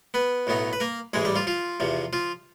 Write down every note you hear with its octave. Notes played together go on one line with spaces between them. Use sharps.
B3 B4
B1 A2 F#3 B3 D#4
B4
A#3 A#4
A1 G#2 E3 G#3 G#4
G3 G4
F3 F4
F3 F4
E2 C3 F3
F3 F4